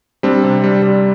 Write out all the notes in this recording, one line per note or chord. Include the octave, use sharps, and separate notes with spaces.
G3 C4 D4
C3
G3
G3